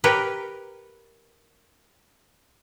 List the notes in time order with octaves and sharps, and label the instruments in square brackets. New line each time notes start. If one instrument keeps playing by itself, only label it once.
[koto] G4 A#4 B4 C#5 G5